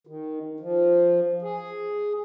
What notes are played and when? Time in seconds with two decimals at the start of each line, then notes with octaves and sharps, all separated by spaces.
0.07 D#3
0.60 F3
1.42 G#4